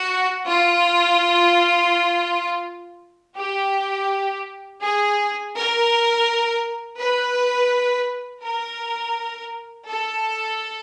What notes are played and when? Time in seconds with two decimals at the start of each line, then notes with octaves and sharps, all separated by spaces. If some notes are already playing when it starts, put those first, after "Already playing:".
Already playing: F#4
0.47 F4
3.36 G4
4.82 G#4
5.54 A#4
6.98 B4
8.43 A#4
9.87 A4